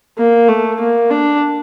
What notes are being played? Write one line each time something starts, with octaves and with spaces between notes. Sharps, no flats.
A#3
A3
A#3
D4